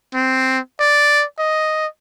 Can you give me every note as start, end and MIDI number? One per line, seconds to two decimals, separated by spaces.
0.14 0.59 60
0.80 1.24 74
1.38 1.87 75